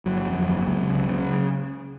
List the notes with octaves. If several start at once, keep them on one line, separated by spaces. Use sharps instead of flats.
G1 F#3
F2
G1
C#2
C#3
C#3